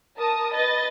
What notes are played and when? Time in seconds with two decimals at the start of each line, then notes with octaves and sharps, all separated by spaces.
0.16 A#4 A5 D#6
0.52 B4 D#5 A6